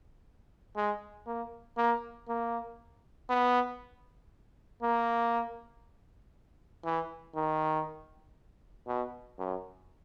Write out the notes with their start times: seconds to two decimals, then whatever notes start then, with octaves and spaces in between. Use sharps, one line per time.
0.76 G#3
1.26 A#3
1.77 A#3
2.28 A#3
3.30 B3
4.82 A#3
6.85 E3
7.35 D#3
8.87 B2
9.39 F#2